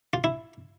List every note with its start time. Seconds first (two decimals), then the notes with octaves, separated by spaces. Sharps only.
0.13 F4
0.24 E4